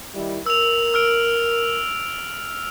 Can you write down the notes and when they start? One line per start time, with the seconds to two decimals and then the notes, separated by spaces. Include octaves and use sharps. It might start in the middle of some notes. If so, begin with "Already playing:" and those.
0.14 D#3 G3 E4
0.46 A#4 E6 F7
0.94 E6 F6 D7